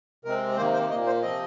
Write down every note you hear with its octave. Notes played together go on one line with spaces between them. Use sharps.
C3 G#3 C4 A#4
C3 D#3 A#3 C5
C5
A#2 A#3 D#5
C5
C3 F3 C4 D#5